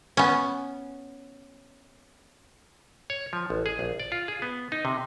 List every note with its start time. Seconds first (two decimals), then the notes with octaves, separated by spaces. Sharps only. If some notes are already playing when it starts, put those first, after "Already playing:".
0.17 B3 C#4
3.10 C#5
3.33 F3
3.50 A1
3.66 G#4
3.79 A#1
4.00 D5
4.12 F4
4.28 G#4
4.42 B3
4.72 D#4
4.85 C3